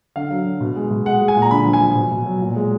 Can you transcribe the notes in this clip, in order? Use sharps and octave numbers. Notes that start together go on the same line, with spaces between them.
D3 F5
F#3
D3
B2
G#3
B2
G#3 F#5
G#3
G#5
A#2
A#5
D3 B5
F3
G#5
F3
B2
B2
F#3
A#2
G#3